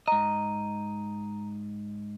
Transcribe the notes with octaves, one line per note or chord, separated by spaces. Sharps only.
G#2 D#5 A#5